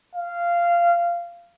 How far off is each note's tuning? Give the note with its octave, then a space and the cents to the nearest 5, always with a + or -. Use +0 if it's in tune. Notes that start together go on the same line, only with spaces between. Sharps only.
F5 -15